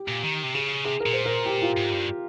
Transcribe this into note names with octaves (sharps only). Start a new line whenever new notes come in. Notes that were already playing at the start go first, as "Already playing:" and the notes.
Already playing: G4
A#2
D#3
C3
C#3 G#4
C3 G#4
A#4
A#2
C5
A#4
G4
F4
G#2
G2